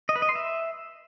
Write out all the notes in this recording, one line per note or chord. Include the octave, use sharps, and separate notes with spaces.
D#5
B4
D#5
C6
E5